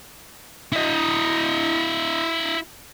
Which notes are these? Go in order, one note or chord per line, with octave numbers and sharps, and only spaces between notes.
E4 D#5